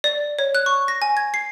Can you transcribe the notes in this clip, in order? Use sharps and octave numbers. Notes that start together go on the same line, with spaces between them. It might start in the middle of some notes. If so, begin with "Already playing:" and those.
D5
C#5
F#6
C#6
A#6
G#5
G#6
C7